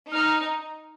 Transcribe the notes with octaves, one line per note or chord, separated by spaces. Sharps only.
D#4 F6